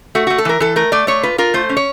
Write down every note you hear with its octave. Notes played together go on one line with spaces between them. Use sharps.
A3 F#4
A3 F#4
A4
E3 A#4
E3 A4
A3 A#4
A3 D5
A3 C#5
F4 B4
F4 A#4
A3 C5
C#4
C#5